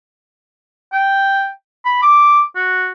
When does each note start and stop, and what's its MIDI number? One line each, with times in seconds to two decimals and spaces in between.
0.92 1.49 79
1.85 1.98 83
2.02 2.41 86
2.55 2.90 66